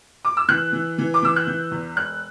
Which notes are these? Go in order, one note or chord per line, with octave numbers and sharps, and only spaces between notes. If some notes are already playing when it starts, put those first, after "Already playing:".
D6
E6
E3 F#6
E3
E3
D6
E3 E6
F#6
E3 G6
E2
E1 F#6